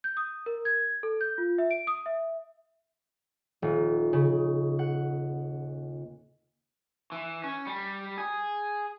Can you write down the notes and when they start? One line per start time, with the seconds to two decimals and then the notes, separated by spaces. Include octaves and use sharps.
0.04 G6
0.17 D#6
0.46 A#4
0.65 G#6
1.03 A4
1.21 G6
1.38 F4
1.58 E5
1.71 D7
1.87 D#6
2.06 E5
3.62 D#1
4.13 C#3
4.79 F#5
7.12 E3
7.44 C#4
7.67 G3
8.18 G#4